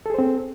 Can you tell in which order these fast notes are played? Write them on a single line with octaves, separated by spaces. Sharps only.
A4 G#4 C5 C4